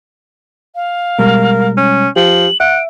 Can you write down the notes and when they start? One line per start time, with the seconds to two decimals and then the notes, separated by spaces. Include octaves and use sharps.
0.75 F5
1.19 B2 G3 G#3 A#4
1.77 C#4
2.16 F3 G4 F#7
2.60 E5 F#5 D7